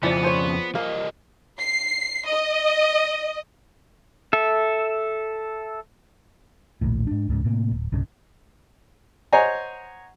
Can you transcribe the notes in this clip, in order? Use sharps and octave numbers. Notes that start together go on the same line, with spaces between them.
F2 C#3 E3 F3 B3 D5
G#4 C5 C#5
G3 A#3 D#5 F5
C7
D#5
A4 E5
A#1 D#2 A2
G#2 D4
C#2 G#2 C#3
A2 C3 A#3
D1
B1 G2 C#3
C5 C#5 D#5 F#5 G#5 A#5